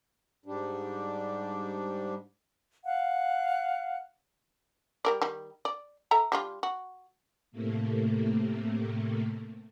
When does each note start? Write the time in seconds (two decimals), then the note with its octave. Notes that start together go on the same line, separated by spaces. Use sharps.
0.46 G#2 G3 D4
2.85 F5 F#5
5.05 G3 A#4 D5
5.22 D#3 G3
5.65 D5
6.11 A4 E5 A#5
6.32 G3 D4 F4
6.63 F#4
7.52 A2 C3 A3 A#3